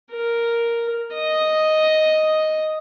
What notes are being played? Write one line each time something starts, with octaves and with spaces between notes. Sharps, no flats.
A#4
D#5